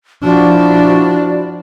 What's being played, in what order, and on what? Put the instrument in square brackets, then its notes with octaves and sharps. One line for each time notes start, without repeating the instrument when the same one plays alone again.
[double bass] F3 D4 [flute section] E4 F#4 D5